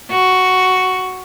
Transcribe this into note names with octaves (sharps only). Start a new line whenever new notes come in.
F#4